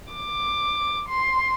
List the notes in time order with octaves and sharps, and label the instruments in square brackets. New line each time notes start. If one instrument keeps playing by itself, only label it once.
[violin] D6
C6